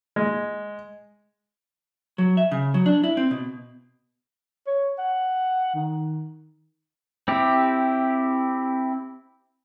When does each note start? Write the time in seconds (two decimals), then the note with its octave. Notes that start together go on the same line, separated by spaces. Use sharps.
0.16 G#3
2.18 F#3
2.37 E5
2.51 C#3
2.74 F#3
2.86 D4
3.04 E4
3.17 C4
3.31 B2
4.67 C#5
4.99 F#5
5.74 D#3
7.28 C4 E4 G4